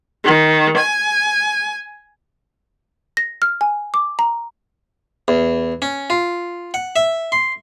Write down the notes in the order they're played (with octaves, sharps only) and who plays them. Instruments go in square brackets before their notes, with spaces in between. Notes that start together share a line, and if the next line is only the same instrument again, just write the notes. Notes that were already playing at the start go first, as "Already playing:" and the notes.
[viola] D#3
G#5
[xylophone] A#6
F6
G#5
D6
A#5
[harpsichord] E2
C#4
F4
F#5
E5
C6